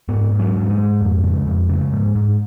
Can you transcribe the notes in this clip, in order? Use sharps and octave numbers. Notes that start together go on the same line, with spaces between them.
G#2 B3
G#2
F#3
G#2
F#3
G#3
G#2
F2
C#3
F2
C#3
G#2
G#2